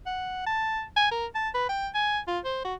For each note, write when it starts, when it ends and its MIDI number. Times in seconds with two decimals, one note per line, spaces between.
0.06 0.42 78
0.46 0.82 81
0.96 1.07 80
1.11 1.26 70
1.35 1.49 81
1.54 1.66 71
1.69 1.88 79
1.95 2.19 80
2.27 2.39 65
2.45 2.63 72
2.65 2.74 66